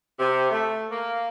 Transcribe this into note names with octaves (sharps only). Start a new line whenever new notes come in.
C3
A3
A#3